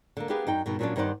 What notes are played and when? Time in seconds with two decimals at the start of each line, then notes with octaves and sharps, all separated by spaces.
0.17 D3 A#3
0.29 A#3 B3 D4 G4 G#4 B4
0.47 F#2 D#4 G5
0.66 G#2 B2 D#3
0.79 A#2 F3 F#3 A3 C#4 D4
0.96 G2 D#3 D#4 C5 D5 F#5